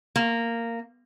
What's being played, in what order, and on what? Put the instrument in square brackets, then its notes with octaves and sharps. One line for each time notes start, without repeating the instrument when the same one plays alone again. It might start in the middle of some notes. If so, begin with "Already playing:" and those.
[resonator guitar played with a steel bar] A#3